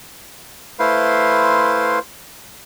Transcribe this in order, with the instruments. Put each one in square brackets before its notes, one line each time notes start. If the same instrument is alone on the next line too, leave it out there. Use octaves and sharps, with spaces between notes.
[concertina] A3 E4 B4 C5 F5 C6